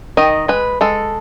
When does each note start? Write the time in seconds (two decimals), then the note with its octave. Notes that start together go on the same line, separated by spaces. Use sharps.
0.17 D#3 D#5
0.48 G#3 B4
0.81 G#3 A4